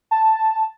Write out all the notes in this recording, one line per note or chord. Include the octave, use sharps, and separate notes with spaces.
A5